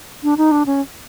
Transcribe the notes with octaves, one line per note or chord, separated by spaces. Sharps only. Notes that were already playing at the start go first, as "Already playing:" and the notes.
D4
D#4
D4
C#4